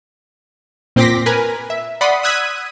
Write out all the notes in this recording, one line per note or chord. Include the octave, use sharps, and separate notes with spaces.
A#2 C4 C6 D6 A#6 B6
A#4 B4 G#5
E5
D5 F#5 B5 C6 D#6
D#6 E6 F#6 G#6 B6 D#7